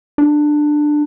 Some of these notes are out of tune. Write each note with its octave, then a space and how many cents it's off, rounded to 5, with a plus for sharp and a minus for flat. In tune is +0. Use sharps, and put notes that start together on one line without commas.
D4 +15